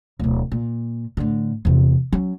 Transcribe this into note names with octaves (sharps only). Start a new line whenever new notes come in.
D1 B2
A#2
A2 D3
E2 C3
F#3 C#4